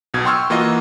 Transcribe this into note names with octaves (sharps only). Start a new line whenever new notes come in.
B1 B2 G#6
G5 C6 C#6 E6 F6
E3 A#3 F4 F#4 D#5